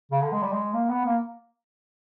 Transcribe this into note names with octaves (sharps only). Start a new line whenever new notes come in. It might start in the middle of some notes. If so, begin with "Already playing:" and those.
C#3
D3
G#3
G3
G#3
A#3
B3
A#3